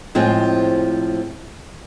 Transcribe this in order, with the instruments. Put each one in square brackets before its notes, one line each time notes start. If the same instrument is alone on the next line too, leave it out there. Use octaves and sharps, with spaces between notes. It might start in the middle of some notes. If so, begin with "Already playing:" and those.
[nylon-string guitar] A2 F3 G#3 C4